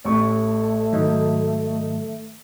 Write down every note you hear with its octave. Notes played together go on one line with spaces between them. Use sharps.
A1 A3 C#6
G#2 D#3 F#3 D#4